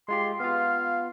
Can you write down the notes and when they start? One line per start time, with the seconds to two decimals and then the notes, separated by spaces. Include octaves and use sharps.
0.08 G#3 F4 G4 C6
0.40 B3 F4 F5